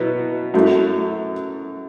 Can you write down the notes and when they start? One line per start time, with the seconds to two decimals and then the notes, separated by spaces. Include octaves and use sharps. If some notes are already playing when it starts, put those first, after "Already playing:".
Already playing: B2 F#3 B3 E4
0.54 F#2 F#3 A3 E4